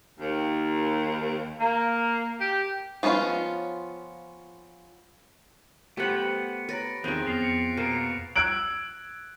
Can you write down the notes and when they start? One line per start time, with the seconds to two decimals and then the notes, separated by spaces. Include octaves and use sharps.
0.20 D#2
1.60 A#3
2.40 G4
3.03 F3 B3 C#4 E4 F4
5.97 A3 B3 G4 C5 F#5
6.69 B4 C#5 A#5 A6 A#6 D7
7.04 E2 D#3 F3 C4 G#4 F#6 D7
7.27 F2 F3 B3 A#6 C7 F7
7.42 C#7
7.77 B2 A#3 A#4
8.36 E6 F#6 G#6 D7 F#7